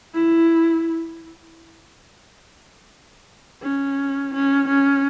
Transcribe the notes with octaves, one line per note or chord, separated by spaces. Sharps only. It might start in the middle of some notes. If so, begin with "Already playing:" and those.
E4
C#4
C#4
C#4